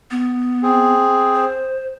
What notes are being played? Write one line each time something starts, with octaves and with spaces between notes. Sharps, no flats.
B3
C4 G#4
C5